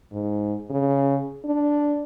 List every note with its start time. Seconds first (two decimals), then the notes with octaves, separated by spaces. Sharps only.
0.13 G#2
0.70 C#3
1.45 D4